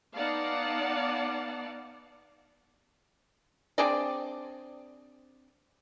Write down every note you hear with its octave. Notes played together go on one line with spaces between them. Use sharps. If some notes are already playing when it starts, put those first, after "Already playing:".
B3 D#4 D5 F5 F#5 A5
C4 D4 G#4 D5